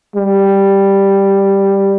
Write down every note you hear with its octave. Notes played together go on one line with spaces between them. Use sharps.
G3